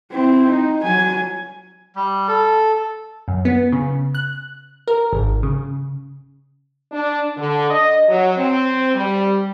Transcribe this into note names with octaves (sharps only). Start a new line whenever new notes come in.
C4 E4
D#4
F#3 G#5
G3
A4
F#2
B3
C#3
F#6
A#4
G#1
C#3
D4
D3
D#5
F#3
C4
G3